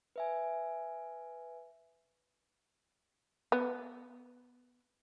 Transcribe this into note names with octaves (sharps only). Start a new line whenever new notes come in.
B4 E5 G#5
B3